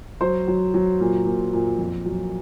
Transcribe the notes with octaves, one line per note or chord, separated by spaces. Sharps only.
F#3 C5
F#3
F#3
A#2
A#2
A#2
F2
F#3